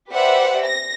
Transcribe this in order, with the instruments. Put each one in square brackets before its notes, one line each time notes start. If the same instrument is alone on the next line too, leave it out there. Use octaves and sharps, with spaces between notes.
[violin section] G4 B4 C5 D5 E5 F#5
A#6